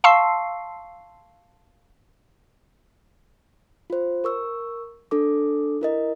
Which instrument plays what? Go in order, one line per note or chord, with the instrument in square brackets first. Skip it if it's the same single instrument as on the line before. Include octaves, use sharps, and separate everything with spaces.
[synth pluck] F5 A5 C6 C#6 E6 C7
[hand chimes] F4 C5
A#4 C#6 E6
D4 A4 D6
E4 A#4 D#5